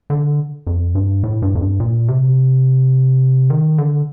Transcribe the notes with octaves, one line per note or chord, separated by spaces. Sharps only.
D3
F2
G2
A2
G2
F2
G2
A#2
C3
D#3
D3